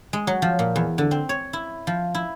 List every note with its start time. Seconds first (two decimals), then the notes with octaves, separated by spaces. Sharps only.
0.13 G#3
0.27 F#3
0.42 F3
0.59 A#2
0.76 E2
0.98 D3
1.11 C4
1.29 C#5
1.53 E4
1.87 F3
2.15 E4